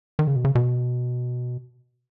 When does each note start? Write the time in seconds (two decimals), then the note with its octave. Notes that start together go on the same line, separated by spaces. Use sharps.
0.19 D#3
0.27 C#3
0.36 B2
0.45 C#3
0.55 B2